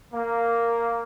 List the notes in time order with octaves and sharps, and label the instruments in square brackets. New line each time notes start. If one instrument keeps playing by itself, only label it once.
[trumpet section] A#3